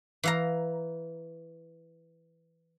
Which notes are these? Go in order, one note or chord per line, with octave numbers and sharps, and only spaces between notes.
E3 F5 A#5